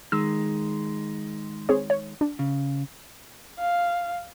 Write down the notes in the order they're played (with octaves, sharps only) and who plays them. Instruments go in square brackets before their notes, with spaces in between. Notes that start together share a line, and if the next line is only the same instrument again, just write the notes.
[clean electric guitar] D#3 G#3 [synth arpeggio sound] E6
[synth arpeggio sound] C4 G#4 C#5
C#5
D4
[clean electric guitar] C#3
[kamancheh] F5